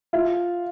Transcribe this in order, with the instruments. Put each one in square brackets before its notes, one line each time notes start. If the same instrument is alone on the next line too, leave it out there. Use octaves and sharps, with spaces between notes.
[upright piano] F4 [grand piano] E5